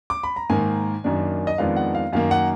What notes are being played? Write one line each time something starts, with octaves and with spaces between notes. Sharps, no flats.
D6
B5
A#5
G#2 D#3 A#3 G#5
F#2 D#3 A#3 D4
D#5
F2 D#3 G#3 B3 D4 F5
F#5
F5
F#2 D#3 A#3 F5
F#5